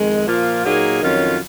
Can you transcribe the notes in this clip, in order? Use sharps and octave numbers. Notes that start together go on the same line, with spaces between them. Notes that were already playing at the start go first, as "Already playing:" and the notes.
Already playing: F2 D#3 G#3
A#2 F3 A#3 F4
A#2 F#3 A#3 D#4 G#4
F2 D#3 F#3 C#4 F4